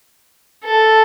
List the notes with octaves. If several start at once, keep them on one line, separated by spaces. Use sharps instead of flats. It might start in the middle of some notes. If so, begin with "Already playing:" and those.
A4